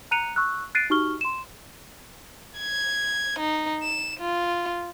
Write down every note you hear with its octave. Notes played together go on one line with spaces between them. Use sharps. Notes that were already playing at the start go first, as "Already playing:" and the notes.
A#5 F#6 C#7 D#7 F7
C#6 E6 F#6
F#6 A6 C7 D7 D#7
D#4 F#4 G4 C#6 F6 G7
C6 E7
G#6
D#4
E7
F4